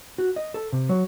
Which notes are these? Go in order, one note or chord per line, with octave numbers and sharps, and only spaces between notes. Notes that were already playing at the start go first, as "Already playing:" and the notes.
F#4
D#5
A4
C3
F#3